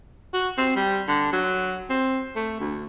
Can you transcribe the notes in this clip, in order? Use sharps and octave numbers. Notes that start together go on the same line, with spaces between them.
F#4
C4
G3
D3
F#3
C4
A3
D2